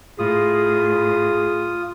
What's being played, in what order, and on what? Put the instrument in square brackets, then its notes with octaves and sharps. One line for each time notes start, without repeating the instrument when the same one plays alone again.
[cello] A2 [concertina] F4 D#6 [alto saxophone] G#4